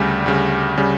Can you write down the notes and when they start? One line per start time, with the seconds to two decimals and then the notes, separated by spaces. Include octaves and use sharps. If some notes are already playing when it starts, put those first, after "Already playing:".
Already playing: D2 C#3 G3
0.26 D2 C#3 G3
0.78 C#3 G3